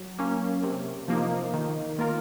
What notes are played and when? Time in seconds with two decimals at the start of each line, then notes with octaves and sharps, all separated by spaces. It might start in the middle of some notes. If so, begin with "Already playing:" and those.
Already playing: F#3
0.19 A#3 C#4
0.63 C3
1.08 F3 A#3 D#4
1.53 D#3
1.99 A#3 F4 A#4